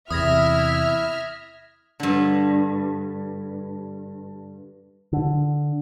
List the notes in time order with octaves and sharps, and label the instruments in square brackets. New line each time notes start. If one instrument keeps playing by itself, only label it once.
[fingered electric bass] E2 C3 [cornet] E4 [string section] E5 F6 [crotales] D#6 G#6 A#6
[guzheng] G2 D3
[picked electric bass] D3